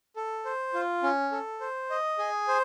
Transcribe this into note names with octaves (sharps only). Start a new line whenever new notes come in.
A4
C5
F4
C#4
A4
C5
D#5
G#4
C5